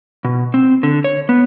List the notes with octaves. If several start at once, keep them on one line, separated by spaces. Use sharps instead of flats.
B2
C4
D3
C#5
B3